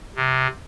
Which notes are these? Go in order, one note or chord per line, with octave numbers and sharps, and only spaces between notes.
C3